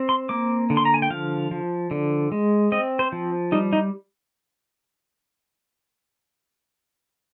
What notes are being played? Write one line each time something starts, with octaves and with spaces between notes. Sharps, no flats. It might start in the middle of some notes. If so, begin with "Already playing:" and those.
Already playing: C4
C6
A#3 D6
D3
C6
A#5
G#5
G5
F3 F5
F3
D3
G#3
C4 D#5
C5
F3
G3 D#4
D#4